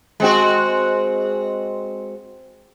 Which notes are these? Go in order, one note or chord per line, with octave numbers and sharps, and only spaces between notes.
G#3 C4 F#4